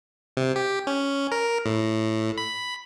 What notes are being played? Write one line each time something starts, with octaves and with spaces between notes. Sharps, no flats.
C3
G4
C#4
A#4
A2
B5